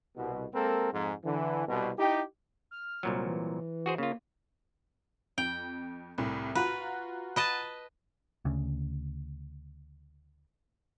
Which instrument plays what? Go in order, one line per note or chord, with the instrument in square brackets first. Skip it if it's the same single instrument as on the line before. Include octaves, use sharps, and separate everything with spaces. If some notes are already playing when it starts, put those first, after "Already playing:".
[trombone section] C2 B2
G#3 A#3 C4 A4 A#4
F2 G#2
D3 E3
C2 B2
D#4 E4 G4
[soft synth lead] F6
[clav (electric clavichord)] C2 A#2 F#3
[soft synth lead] E3
[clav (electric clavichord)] F#4 G#4 C5
[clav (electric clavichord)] C#3 F4 [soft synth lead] A#3
[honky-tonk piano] F2 [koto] G5
[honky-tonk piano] C2 A2
[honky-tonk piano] F4 F#4 A#5 [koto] B4
[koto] B4 D#5 A5
[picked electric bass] D2 C#3